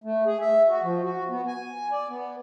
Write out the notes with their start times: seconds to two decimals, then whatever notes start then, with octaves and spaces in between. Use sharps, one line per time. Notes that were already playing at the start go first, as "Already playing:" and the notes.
0.04 A3
0.26 G#4
0.41 E5
0.69 F#4
0.83 F3
1.04 F#4
1.30 B3
1.47 G#5
1.92 D5
2.09 B3